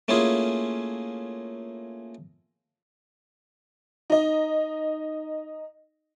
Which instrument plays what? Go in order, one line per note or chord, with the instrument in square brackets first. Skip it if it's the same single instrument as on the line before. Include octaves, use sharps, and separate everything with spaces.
[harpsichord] A3 A#3 C#4 E4 F4 G#4
[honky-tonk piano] D#4 D#5